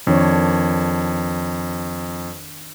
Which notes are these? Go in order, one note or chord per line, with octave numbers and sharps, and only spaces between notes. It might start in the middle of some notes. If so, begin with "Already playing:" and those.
F2 D#3 D4 C#5